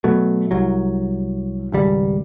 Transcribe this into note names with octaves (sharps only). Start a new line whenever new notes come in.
B2 F#3 A3
C2 F#3
G#1 C#2 G3